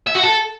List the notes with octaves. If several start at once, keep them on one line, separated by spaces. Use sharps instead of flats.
E5
F#4
A4